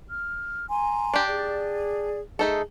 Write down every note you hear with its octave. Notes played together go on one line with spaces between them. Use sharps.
F6
G#5 A#5 C6
D4 G4
G#4 D5
A3 D#4 G#4 A4